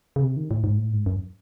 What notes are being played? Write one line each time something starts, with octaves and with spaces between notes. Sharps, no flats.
C#3
C3
D#3
A2
G#2
A2
G#2
F#2